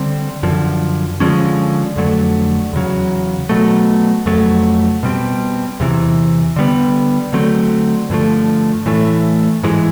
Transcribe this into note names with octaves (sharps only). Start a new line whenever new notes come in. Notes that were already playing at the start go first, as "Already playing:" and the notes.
Already playing: D3 G3 C4
F#2 D3 F3
D3 F3 G#3 C#4
F2 D3 F#3 A3
E2 C#3 F#3
B2 F#3 A3
F2 C#3 F#3 A3
B2 G3 C4
E2 C3 E3
D3 G3 B3
D3 F#3 A3 C4
G2 D3 F3 A3
A2 E3 A3
G#2 E3 G#3